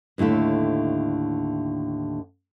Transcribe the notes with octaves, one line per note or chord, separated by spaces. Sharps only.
D#2 A2 D3 E4 E5